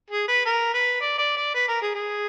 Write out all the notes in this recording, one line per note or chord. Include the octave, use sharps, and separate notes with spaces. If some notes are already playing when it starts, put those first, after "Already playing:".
G#4
B4
A#4
B4
D5
D5
D5
B4
A#4
G#4
G#4